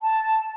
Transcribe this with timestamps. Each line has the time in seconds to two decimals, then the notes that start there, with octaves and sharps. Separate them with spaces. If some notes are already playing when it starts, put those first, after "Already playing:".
0.03 A5